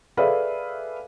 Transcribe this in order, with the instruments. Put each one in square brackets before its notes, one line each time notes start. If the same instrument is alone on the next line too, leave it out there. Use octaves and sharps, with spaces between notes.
[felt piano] G#4 A4 B4 D5 E5 F5